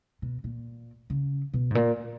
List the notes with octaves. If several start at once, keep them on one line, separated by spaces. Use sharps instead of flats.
B2
A#2
C#3
B2
G#2
A#2